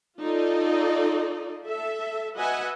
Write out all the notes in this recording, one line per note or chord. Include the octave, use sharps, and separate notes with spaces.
D#4 F4 A4 D5 D#5
A4 E5
F#4 B4 D#5 E5 F#5 G#5